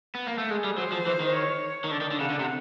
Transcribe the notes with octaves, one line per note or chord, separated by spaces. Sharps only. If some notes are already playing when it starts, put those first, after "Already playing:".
B3
A#3
A3
G#3 G#4
G3
F#3 C5
F3
E3
D#3
C#5
D#3
D3 D5
D#3
D3
C#3 F#5
D3
C3